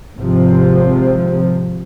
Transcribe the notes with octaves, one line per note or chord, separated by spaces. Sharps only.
G#1 C3 F3